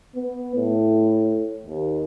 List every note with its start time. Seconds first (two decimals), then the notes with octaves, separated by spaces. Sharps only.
0.15 B3
0.56 A2
1.65 D#2